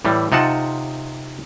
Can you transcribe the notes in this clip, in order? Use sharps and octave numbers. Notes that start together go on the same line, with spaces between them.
A2 E3 G3
C3 D#4 F4 F#5 A5